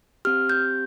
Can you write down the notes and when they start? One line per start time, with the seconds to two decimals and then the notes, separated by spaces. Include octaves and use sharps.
0.25 C4 G4 F6
0.50 G6